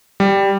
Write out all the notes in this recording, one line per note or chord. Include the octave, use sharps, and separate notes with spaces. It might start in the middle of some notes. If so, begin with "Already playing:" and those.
G3